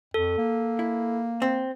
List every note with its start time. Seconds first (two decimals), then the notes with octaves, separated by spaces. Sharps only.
0.14 F2 A4
0.38 A#3
0.79 E4
1.42 C4